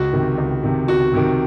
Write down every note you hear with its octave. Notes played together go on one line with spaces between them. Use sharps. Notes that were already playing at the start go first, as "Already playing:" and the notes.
Already playing: C#2 F#4
C3 D#3
C#2
C3 D#3
C#2 F#4
C3 D#3